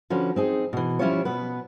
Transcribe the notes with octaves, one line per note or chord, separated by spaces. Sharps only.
D3 F3 C#4 F#4 B4
C4 D#4 G#4
B2 E3
F3 G3 C#4 E4 F4 C#5
B2 B3 B4